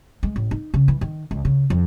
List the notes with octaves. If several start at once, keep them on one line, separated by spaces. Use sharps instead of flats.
G#3
A1
D#4
C#3
E3
D#3
C#2
C#3
F2